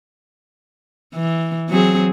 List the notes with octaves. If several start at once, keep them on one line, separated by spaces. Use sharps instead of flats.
E3
F#3 C4 G#4